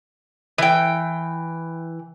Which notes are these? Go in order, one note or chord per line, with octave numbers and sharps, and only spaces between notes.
E3 G5